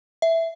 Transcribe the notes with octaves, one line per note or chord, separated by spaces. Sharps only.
E5